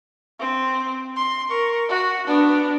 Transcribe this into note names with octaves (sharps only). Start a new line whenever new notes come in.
C4
C6
A#4 C#6
F#4
B3 D4